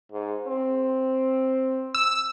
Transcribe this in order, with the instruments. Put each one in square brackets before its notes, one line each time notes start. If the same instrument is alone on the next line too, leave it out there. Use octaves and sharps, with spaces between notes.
[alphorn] G#2
C4
[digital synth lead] E6